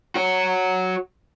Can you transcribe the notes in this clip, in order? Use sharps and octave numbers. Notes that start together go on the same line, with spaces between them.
F#4 C#5